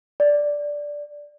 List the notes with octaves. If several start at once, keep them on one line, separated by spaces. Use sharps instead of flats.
D5